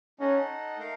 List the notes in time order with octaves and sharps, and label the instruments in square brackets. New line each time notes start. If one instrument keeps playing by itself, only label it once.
[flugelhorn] C#4 [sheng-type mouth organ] D#4 A4 D#5 F#5
[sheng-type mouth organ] A3 D#4 A#4 F5